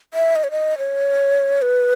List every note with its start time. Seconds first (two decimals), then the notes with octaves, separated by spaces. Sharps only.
0.14 E5
0.36 D#5
0.44 C#5
0.51 D#5
0.78 C#5
1.62 B4